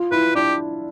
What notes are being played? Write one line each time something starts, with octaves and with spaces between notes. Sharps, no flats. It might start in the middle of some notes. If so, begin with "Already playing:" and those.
Already playing: F4
E4 B4
D4 G4